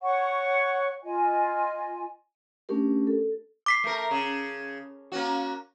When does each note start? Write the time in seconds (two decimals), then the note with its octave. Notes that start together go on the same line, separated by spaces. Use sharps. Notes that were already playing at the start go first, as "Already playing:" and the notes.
0.01 C#5 F#5 C#6
1.02 F4 D#5 G#5
2.69 A3 C#4 D4 G4 A#4
3.07 A4
3.66 D6 B6 C7
3.84 A3 A#4
4.11 C#3
5.12 A#3 C#4 F#4